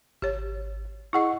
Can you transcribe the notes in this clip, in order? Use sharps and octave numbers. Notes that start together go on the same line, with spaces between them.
G#1 G4 C#5
E4 G#4 D#5 F#5 C#6